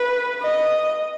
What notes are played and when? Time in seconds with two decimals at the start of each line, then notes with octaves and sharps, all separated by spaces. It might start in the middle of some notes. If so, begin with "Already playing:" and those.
Already playing: B4
0.43 D#5